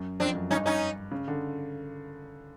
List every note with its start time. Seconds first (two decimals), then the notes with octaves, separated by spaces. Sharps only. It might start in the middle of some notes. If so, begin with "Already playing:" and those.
Already playing: F#2
0.20 F2 C4 D4
0.35 F#2
0.50 G2 C#4 D#4
0.66 C#4 D#4
1.11 C#3
1.28 D3